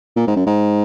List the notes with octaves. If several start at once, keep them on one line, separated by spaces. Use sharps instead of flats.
A#2
G#2
F#2
G#2